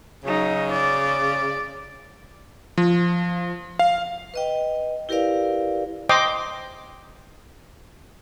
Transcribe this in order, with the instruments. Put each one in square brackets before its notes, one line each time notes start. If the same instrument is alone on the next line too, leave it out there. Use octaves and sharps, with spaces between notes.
[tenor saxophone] C#3 [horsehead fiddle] F#3 D#4
[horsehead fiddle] D5
[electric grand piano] F3
F5
[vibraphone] B4 D#5 G5
E4 G4 A#4 B4 D5 F5
[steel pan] C5 D#5 G5 C6 D6